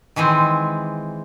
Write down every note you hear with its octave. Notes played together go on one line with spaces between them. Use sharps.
D#3 E3 G#3 C4